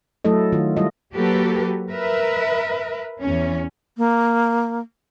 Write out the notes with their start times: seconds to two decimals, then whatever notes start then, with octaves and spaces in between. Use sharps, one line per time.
0.25 F#3 A3 E4 A4 D#5
0.52 D#3 F4
0.77 G3 E4 F4 D#5
1.14 F#3 A#3 F#4 G4 A4 B4
1.90 A#4 B4 E5
3.21 E2 C#4
3.98 A#3